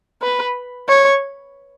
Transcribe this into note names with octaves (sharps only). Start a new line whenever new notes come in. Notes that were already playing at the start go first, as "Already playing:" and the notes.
B4
C#5